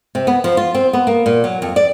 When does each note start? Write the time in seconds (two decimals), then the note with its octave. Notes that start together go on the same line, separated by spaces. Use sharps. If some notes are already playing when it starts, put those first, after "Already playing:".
0.15 C3
0.27 B3
0.44 F3
0.57 F4
0.74 C4
0.93 B3
1.07 A#3
1.26 A#2
1.44 F#3
1.62 F2
1.76 D5